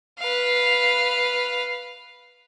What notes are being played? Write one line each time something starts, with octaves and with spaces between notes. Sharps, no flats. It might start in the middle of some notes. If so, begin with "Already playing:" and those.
B4 F5